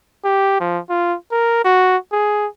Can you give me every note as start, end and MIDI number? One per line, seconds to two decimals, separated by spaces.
0.24 0.59 67
0.60 0.79 53
0.90 1.15 65
1.32 1.63 70
1.65 1.97 66
2.12 2.47 68